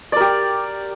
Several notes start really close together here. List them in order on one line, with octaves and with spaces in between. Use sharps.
D5 A#4 G4